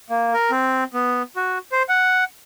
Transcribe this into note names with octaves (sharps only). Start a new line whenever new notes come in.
A#3
A#4
C4
B3
F#4
C5
F#5